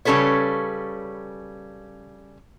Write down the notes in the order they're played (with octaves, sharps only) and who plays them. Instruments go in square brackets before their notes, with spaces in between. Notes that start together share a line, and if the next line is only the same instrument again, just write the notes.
[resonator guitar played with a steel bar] C#3 G3 C#4 A4 B4 C#5